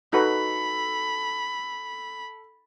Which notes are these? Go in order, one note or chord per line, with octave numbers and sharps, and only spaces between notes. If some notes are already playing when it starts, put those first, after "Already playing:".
D#4 F#4 A4 B4 B5